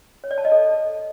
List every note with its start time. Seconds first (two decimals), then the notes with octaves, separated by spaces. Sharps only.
0.24 C#5
0.31 D5
0.38 A5
0.45 D#5
0.52 A4